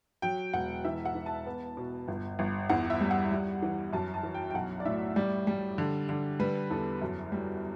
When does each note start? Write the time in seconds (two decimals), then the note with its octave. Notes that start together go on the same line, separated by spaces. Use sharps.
0.22 F#3 G5
0.53 E1 F#5
0.85 E3 E5
1.05 F#5
1.15 E3
1.26 A5
1.46 B3
1.77 B2
2.08 G1
2.39 G1
2.69 E2 F#5
2.90 E5
3.01 G3
3.11 F#5
3.31 G3
3.62 E3
3.93 F#2 A5
4.14 A5
4.23 E3
4.34 G5
4.50 G5
4.54 B1 F#5
4.80 D5
4.85 A2 E5
5.16 G3 D5
5.47 G3
5.78 D3
6.09 D3
6.39 G3 B4
6.70 E2 A4
7.01 F#2
7.32 G3